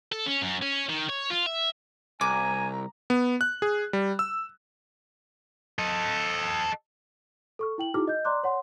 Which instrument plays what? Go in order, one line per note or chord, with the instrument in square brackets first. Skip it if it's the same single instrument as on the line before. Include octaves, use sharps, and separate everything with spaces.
[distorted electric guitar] A4
C#4
F#2
C#4
D#3
C#5
F4
E5
[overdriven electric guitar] C2 [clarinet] G#5 [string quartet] A#5 [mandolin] D6
[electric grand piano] B3
F#6
G#4
G3
E6
[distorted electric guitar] A4 D#5
[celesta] A4 C#6 F6
E4 G5 F#7
D#4 E4 F#4 G#4 D6 F6
D#5 G6
D5 A#5 C6 D6 F#6
C#5 F#5 C6